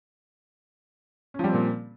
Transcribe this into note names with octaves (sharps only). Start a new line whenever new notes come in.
A#2 F3 G3 C4 C#4